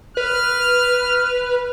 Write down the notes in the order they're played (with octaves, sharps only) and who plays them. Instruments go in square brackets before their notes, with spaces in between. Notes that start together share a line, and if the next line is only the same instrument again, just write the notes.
[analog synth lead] B4 [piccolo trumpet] F6